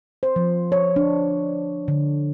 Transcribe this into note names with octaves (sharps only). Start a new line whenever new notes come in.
C5
F3
C#5
D4
D3